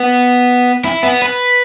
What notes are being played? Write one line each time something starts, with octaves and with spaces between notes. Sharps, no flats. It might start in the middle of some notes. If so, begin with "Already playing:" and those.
Already playing: B3
E4
B3
B4